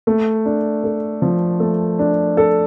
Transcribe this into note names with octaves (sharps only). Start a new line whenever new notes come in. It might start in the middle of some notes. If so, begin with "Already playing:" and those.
A3
D4
A4
F3
A3
D4
A4